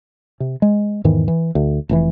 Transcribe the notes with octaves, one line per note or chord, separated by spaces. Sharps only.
C3
G#3
E2 G#2 D#3 E3
E3
D2
F1 C3 E3